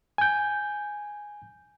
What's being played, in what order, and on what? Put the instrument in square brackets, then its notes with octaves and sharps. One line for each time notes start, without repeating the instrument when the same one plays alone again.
[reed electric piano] G#5 G6